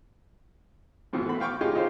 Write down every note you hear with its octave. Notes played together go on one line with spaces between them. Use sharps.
F2 G#2 B2 D#3 E3
A3 F#4 B5
F5 G5 C#6 D6
G#3 C#4 D#4 F4 G4 G#4
C#3 D#4 F4 G4 C5